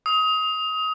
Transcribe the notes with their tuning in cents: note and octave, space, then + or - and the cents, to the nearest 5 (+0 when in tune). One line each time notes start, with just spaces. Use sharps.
D#6 +25